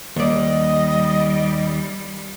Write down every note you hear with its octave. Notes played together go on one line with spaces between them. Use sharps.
D#2 G3 D5 D#5